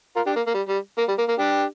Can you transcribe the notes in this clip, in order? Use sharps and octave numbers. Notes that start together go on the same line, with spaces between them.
F4 A#4
D4 G4
A#3
A#3
G3
G3
A#3
G3
A#3
A#3
D4 G4